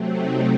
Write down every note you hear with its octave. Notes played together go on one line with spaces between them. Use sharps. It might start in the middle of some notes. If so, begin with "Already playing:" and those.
Already playing: C3 F#3 A3 C4
D#4